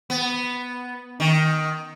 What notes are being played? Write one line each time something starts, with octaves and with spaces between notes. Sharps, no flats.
B3
D#3